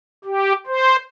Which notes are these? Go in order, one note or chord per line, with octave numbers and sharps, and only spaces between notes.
G4
C5